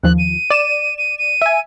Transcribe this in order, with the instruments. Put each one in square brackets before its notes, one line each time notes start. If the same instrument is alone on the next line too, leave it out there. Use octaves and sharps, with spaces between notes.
[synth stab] D#2 F3 [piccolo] F#6
[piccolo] D#7
[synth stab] D5 E7
[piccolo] D#7
D#7
[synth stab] E5 G#5